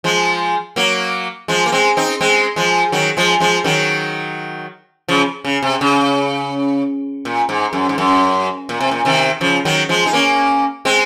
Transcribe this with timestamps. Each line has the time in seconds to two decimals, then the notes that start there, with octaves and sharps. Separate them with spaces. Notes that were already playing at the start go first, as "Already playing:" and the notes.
0.04 F3 G#3
0.76 F#3 A#3
1.48 F3 G#3
1.66 A#3
1.72 G#3 C4
1.97 C4 D#4
2.21 G#3 C4
2.56 F3 G#3
2.92 D#3 F#3
3.17 F3 G#3
3.40 F3 G#3
3.64 D#3 F#3
5.08 C#3 F3
5.44 C#3
5.63 C3
5.81 C#3
7.25 A#2
7.49 G#2
7.73 F#2
7.89 G#2
7.98 F#2
8.69 A#2
8.80 C3
8.91 A#2
9.05 C3 D#3
9.41 C#3 F3
9.65 D#3 F#3
9.89 F3 G#3
10.06 D#4
10.13 A#3 C#4
10.85 G#3 C4